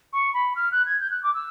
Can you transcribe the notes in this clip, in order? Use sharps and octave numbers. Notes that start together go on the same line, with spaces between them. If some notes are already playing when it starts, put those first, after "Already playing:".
C#6
B5
F6
F#6
G#6
G6
F#6
D6
E6